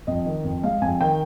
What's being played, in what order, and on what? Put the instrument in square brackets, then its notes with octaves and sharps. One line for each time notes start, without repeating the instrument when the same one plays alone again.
[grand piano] F2 D#5
D#3
F2
G#3 F5
F2 G#5
D#3 G5